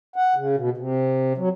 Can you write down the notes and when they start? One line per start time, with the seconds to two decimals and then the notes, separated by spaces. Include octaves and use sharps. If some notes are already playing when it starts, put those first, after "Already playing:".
0.16 F#5
0.36 C#3
0.57 B2
0.77 C3
1.37 F#3